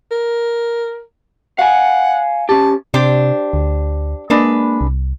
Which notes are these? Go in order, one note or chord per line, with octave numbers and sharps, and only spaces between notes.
A#4
F5 F#5 G#5
C#4 G4 A5
C3 D4 G4 C5
D2
G#3 A#3 D4 B4
C2